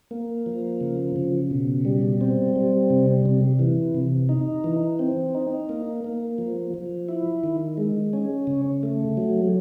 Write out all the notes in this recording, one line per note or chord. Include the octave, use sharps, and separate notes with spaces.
A#3
F3
C#3
C#3
B2
G3
C4
G3
C3
C3
E3
C3
D#4
E3
C4
D#4
A#3
A#3
F3
F3
E4
D#3
G#3
C#4
C#3
A3
F#3